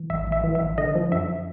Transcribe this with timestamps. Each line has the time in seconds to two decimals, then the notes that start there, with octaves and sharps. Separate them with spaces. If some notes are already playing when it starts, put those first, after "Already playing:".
Already playing: E3
0.10 A1 E5
0.27 A1
0.32 E5
0.44 E3
0.55 E5
0.61 A1
0.78 D3 D#5
0.95 F3
1.12 F#2 E5